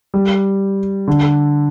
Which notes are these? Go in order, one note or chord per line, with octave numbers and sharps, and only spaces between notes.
G3
D3